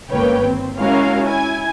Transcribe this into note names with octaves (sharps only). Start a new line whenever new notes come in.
G1 C#2 A#3 B4 C#5 G5
D#2 C4
G#3 C#4 E4 F#4 A#4 F5
E4 G#5 G#6